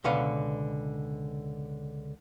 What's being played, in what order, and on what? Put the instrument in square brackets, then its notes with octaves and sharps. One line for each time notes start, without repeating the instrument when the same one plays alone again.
[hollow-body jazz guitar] C#2 B2 D3 B4 F5 F#5